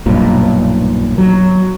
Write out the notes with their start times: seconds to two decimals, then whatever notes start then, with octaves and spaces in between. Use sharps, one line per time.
0.06 B1 G2 A#2
1.18 F#3